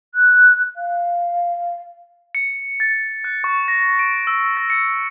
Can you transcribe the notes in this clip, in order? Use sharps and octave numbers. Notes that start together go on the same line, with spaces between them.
F#6
F5
C#7
A6
F#6
C#6
A#6
D7
E6
A#6
C#7